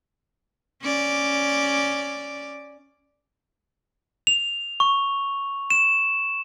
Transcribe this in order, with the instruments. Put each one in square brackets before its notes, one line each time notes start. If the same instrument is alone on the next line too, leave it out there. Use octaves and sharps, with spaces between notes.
[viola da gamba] C#4 D5
[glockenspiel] F7
C#6
E7